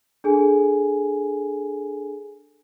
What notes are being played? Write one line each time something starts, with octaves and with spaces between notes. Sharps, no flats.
D4 G#4 A4 G#5